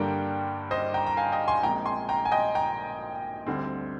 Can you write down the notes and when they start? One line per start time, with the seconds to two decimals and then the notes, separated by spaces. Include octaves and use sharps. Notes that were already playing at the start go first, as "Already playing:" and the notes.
Already playing: G2 D3 G3 A#3 D4 G5 A#5
0.71 C5 D#5
0.94 G5 A#5
1.06 A#5
1.17 F5 G#5
1.32 D#5 G5
1.48 G#5 C6
1.63 A#1 A#2 G#3 C4 G5 A#5
1.85 G#5 C6
2.09 G5 A#5
2.25 G#5
2.32 D#5 G5
2.55 G5 A#5
3.47 D2 D3 G3 C4